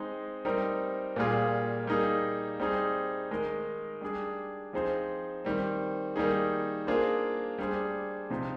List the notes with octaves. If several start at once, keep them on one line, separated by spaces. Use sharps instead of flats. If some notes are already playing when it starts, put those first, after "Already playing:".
Already playing: G#3 C4 D#4
G3 C4 D#4 A#4
A#2 G3 A#3 F4 G#4
G3 A#3 D#4 G#4
G3 C4 D#4 G#4
D#3 G#3 D#4 A#4
G3 D4 G#4
F3 C4 D#4 G#4 C5
D#3 G3 C4
D#3 G3 A#3 D#4 G#4
A#3 D4 F4 G#4 C5
G3 D4 G#4 C5
C3 F3 C4 D#4